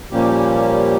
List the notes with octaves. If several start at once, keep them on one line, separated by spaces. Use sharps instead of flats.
A#2 F3 G3 A#3 C#4 G4